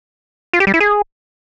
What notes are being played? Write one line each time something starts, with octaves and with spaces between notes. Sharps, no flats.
F4
G4
G3
E4
G#4